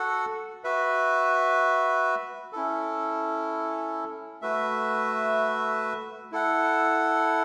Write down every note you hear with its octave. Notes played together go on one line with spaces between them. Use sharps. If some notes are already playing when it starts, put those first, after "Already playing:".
Already playing: F#4 A4 F#5
F#4 B4 E5
C#4 E4 A4
A3 F#4 B4 E5
E4 A4 F#5